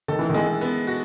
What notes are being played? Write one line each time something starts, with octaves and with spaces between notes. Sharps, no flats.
D#3 A4
E3
D#3
G#3
B3
F#4